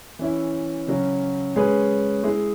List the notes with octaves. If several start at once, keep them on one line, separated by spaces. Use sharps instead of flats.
E3 C#4 E4
C#3 F#3 C#4
G#3 C#4 G#4 B4
G#3 E4 G#4